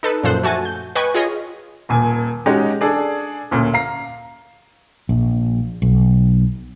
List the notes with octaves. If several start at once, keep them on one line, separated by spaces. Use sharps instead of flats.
D#4 A4 B4
F#2 A#2 F3 A4 C5 F#6
A3 F#4 G#5 A6
G6
B4 D#5 G5 G#5 C#6
F4 G#4 C#5 D#5
D#1 A#2 G#5
G#3 C#4 D#4 F#4 G4
D4 G#4 A4 D5
D2 A#2 C#4
F5 A#5 C7
A#1
B1